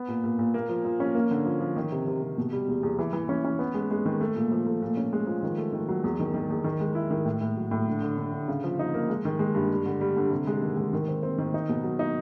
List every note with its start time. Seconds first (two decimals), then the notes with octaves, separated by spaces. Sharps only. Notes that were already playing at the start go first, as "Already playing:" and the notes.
Already playing: B3
0.08 A#2
0.24 A#2
0.39 A#2
0.54 A#3
0.69 F3
0.85 F3
1.00 C#4
1.15 A#3
1.31 D3
1.45 F3
1.60 F3
1.76 D#3
1.92 C3
2.07 C3
2.22 C3
2.38 B2
2.52 G3
2.68 E2
2.83 E2
2.99 E3
3.13 E3
3.29 C#4
3.44 C#4
3.59 B3
3.74 G#3
3.91 G#3
4.06 D#3
4.21 A3
4.36 A#2
4.52 F3
4.67 A3
4.82 A#2
4.97 C#4
5.13 G#3
5.27 F3
5.43 D#3
5.58 A3
5.73 D#3
5.88 F#3
6.04 E2
6.20 D#3
6.34 D#3
6.50 E2
6.64 D#3
6.80 G#3
6.95 E4
7.11 D#3
7.25 A2
7.41 A2
7.57 F#3
7.71 A2
7.88 D3
8.02 D3
8.17 D3
8.32 D3
8.48 C#3
8.64 F3
8.79 D#4
8.94 A#3
9.09 G#3
9.25 D#3
9.39 G#3
9.55 G2
9.70 G3
9.86 D3
10.01 G3
10.16 D3
10.31 C3
10.47 G#3
10.62 D#3
10.77 G#3
10.93 D#3
11.08 C4
11.23 C4
11.38 D#3
11.54 D#4
11.69 B2
11.84 F#3
11.99 D#4